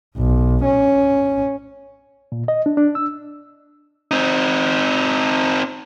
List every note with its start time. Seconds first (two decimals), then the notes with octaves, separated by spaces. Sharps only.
0.17 B1
0.64 C#4
2.32 A#2
2.48 D#5
2.66 D4
2.77 D4
2.95 E6
4.11 C4 D#4